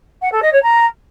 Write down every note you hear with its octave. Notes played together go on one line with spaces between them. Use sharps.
F#5
A4
D#5
C#5
A#5